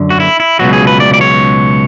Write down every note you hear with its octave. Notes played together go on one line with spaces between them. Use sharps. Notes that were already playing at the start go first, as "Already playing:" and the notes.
Already playing: F#2 D3 F#3
F#4
E4
E4
C#2 B2 F#3 F#4
G#4
B4
D5
D5
C#5